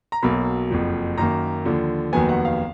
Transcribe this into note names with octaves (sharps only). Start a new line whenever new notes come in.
A#5
B1 B2 F#3 A#3 B5
F#1 F2 F3
F#2 D#3 A#3 A#5
D#2 D3 F3
F1 D#2 D#3 F#3 B3 G#5
F#5
F5